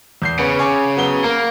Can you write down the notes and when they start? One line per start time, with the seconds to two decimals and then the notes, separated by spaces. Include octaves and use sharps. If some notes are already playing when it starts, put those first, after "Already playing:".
0.22 E2 G6 C7
0.39 C#3 B3 B4 C#5
0.59 C#5 G#5 D6
0.97 F#3 B3 G7
1.24 A#3 A#4